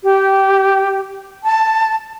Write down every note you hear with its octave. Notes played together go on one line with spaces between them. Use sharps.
G4
A5